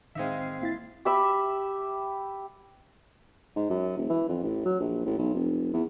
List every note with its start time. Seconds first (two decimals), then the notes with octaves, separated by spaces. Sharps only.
0.15 A1 D#3 G#3 C4 D#4 E5 F5
0.61 A#3 E4 A6
1.05 G4 E5 B5
3.56 G#2
3.70 F#2
3.97 E1
4.10 E3
4.29 F2
4.43 A1
4.65 F#3
4.80 A#1
5.06 A1
5.18 B1
5.34 F1
5.73 E2